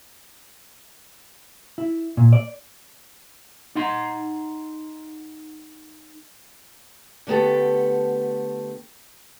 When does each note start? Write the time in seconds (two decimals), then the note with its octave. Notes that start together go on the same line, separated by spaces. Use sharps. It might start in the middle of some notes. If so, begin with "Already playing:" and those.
1.78 E4
2.17 A#2
2.33 D5
3.75 D#4 F#5 C6
7.27 D3 A3 B3 G4 A4